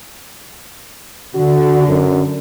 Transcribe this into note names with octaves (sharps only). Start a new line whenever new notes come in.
D3 F#4
F#2